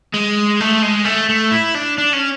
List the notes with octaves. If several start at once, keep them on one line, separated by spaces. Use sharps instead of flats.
G#3
A3
G#3
A3
A3
E4
D4
D4
C#4